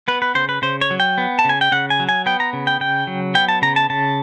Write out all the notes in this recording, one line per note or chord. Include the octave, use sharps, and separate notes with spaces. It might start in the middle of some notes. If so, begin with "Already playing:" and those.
B3 B4
B4
C#3 C5
B4
C#3 C5
C#5
F#3
G5
B3
A5
C#3 G#5
G5
C#3 F#5
G#5
F#3
G#5
B3 G5
A#5
C#3
G5
C#3 G5
F#3
B3 G5
A5
C#3 A#5
A5
C#3 A5